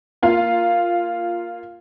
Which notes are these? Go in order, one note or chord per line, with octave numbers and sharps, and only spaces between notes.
A#3 F4 F5